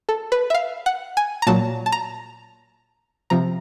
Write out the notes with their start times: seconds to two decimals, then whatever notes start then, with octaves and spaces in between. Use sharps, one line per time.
0.09 A4
0.32 B4
0.50 E5
0.54 F5
0.86 F#5
1.17 G#5
1.42 A#5
1.47 A#2 F#3 A5
1.86 A5
1.92 A#5
3.30 C3 F3 A#5